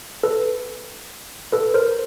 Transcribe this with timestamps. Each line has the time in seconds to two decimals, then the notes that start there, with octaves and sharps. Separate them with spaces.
0.23 A4 B4
1.52 A4 B4
1.74 A#4 C5